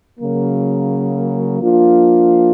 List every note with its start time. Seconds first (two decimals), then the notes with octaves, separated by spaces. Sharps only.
0.19 C#3 F#3 A#3
1.62 F3 A#3 D4 F4